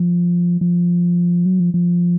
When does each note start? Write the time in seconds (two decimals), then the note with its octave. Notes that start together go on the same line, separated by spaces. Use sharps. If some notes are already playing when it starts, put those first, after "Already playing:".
Already playing: F3
0.61 F3
1.46 F#3
1.60 F3
1.74 F3